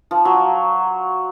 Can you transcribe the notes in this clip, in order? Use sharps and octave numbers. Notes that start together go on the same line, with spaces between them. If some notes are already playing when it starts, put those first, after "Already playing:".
F3
F#3